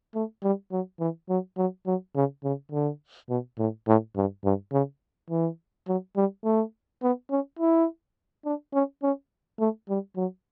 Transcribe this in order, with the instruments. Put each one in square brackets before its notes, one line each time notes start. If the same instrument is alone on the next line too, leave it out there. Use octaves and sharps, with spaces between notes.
[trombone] A3
G3
F#3
E3
F#3
F#3
F#3
C#3
C#3
D3
B2
A2
A2
G2
G2
C#3
E3
F#3
G3
A3
B3
C#4
E4
D4
C#4
C#4
A3
G3
F#3